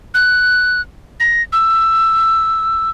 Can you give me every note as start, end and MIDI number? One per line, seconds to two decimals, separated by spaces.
0.14 0.81 90
1.20 1.42 94
1.52 2.90 88